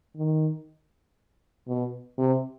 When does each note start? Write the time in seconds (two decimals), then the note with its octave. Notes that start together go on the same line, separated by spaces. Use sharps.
0.16 D#3
1.68 B2
2.18 C3